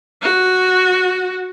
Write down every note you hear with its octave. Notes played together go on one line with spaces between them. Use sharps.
F#4